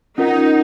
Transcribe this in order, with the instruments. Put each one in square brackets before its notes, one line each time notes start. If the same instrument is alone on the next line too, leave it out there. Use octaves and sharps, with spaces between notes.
[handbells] C#4 F4 A#4 D#5 F#5 [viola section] D#4